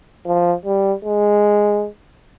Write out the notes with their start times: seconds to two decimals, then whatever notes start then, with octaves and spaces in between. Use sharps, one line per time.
0.26 F3
0.66 G3
1.05 G#3